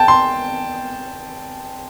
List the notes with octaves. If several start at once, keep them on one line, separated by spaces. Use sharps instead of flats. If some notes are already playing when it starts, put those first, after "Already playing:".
Already playing: G5 A5
C6